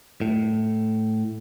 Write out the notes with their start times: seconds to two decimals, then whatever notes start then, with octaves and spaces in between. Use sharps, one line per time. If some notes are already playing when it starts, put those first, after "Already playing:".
0.21 A2